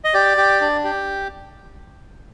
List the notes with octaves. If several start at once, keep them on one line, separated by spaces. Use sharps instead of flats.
D#5
G4 D5
G4
D4
G4